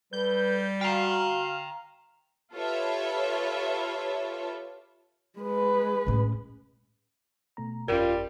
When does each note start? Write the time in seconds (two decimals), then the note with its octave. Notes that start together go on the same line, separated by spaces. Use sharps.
0.13 G3 A4 B4 G6
0.81 F#4 F5 G5 A#5
2.53 F4 G4 A4 B4 C#5 E5
5.38 G#3 B4
6.07 A2 C#4
7.57 B2 A3 A#5
7.88 G1 F2 G3 C#4 F4 A#4